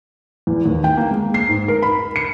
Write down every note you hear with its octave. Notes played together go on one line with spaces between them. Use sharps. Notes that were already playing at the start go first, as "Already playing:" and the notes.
E2
D#2
G5
A#3
G#3
C7
G#2
A#4
B5
C#7